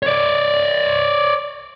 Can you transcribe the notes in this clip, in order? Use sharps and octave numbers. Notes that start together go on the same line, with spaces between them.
C#5 D5